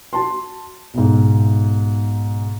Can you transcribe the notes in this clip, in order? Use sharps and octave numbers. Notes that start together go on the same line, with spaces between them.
F#4 A5 C6
B1 G#2